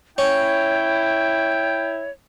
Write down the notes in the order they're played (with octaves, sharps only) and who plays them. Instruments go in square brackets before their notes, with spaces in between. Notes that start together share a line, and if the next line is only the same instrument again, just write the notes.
[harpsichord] C#4 [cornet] E4 [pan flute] C#5 [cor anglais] G5